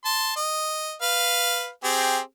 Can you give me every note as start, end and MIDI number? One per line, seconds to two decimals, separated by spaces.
0.05 0.33 81
0.05 0.33 84
0.36 0.95 75
1.02 1.69 71
1.02 1.69 77
1.84 2.19 60
1.84 2.19 67
1.84 2.19 68